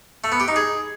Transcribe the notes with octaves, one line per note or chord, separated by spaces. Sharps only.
A3
B3
G4
D#4
G#4